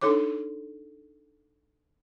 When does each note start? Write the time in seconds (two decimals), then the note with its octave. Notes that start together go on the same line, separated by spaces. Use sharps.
0.01 D4 D#4 A4 C#5 D6